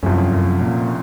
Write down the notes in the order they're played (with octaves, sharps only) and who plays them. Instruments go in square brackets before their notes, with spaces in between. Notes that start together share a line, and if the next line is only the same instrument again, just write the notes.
[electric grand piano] C2 C3 F3 A3 C#4 [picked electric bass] F#2
[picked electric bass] F#2
A#2